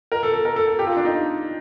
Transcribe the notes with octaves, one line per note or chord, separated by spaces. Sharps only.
A#4
A4
A4
A#4
A4
A4
G4
F4
D4
D#4